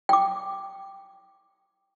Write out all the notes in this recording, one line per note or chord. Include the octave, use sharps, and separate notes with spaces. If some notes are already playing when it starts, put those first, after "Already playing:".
G5 D6